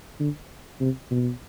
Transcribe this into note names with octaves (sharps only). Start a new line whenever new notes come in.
D3
C3
B2